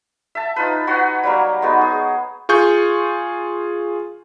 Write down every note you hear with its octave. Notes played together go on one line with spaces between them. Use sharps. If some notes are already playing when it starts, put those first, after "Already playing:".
E5 A5
D#4 F4 B4
F#4 B4 C#5 F#5
F#3 G3 A#3
G#3 B3 D#4 F#4
G#4
F4 G#4 C#6 G6